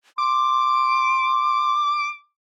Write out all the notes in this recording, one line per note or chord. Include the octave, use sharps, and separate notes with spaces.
C6 D6